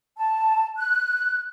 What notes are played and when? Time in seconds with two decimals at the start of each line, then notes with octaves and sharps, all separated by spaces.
0.17 A5
0.78 F#6